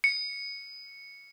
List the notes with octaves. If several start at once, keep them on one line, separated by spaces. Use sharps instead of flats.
C#7